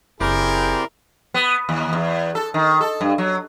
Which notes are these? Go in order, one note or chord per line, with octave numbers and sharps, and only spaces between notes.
F#1 C4 E4 G4 G#4 A#4 D5
B3
D#2
E2
A4
D#3
A4
G2
F#3